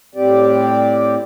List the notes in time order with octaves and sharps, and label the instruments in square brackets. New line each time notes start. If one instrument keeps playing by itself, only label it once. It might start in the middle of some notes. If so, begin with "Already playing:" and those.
[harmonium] A2 G3 C4 G4 D5